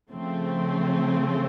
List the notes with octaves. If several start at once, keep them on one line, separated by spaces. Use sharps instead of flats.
C#3 F3 A3 C4